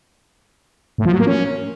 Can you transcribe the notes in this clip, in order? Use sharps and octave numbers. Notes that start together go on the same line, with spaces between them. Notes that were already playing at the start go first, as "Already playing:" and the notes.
A2
F3
F#3
A#3
C#4